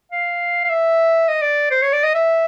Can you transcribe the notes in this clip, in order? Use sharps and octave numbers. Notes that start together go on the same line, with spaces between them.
F5
F5
E5
D#5
D5
C5
C#5
D5
D#5
E5